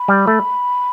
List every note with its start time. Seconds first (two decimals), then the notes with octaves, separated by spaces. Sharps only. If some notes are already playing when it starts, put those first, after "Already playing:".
Already playing: B5
0.08 G3
0.27 A3